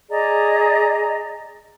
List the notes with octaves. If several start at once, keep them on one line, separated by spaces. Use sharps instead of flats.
G#4 D5 D#5 A#5